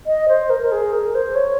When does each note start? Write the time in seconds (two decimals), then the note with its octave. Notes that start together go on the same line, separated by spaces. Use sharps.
0.06 D#5
0.29 C5
0.50 A#4
0.62 A#4
0.72 G#4
0.93 A#4
1.15 C5
1.35 C#5